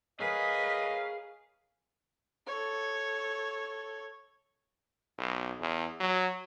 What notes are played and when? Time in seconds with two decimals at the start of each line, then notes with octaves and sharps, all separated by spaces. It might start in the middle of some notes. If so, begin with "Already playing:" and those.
0.20 G#4 A#4 B4 C#5 D#5 F5
2.47 A4 C#5
5.18 B1
5.61 E2
6.00 F#3